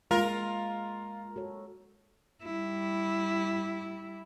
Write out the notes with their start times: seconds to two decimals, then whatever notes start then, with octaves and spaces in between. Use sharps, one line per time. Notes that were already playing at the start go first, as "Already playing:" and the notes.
0.11 G#3 A#3 F4 A#4
1.36 F#4 A4 C#5
2.43 G3 E4